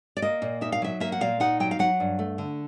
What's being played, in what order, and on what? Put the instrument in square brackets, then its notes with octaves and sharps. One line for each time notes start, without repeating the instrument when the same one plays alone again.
[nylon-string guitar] D5
A#3 D#5
A#2
D#4 E5
F5
F#3 E5
A#3 E5
F#5
A#2 F5
D#4 F#5
F#3 G5
F5
F#3 F#5
G2
A3
D3